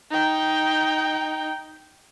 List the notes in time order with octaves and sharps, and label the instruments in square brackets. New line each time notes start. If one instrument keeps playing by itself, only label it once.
[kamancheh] D#4 G5